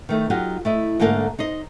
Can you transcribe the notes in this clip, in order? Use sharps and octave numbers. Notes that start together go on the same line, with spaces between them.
D#3 A3 D#4
F#3 D#4 F4 G4 F#5
A3 E4 D#5
G#2 D3 A3 A#3 A4 A#4
D#4 C5 D#5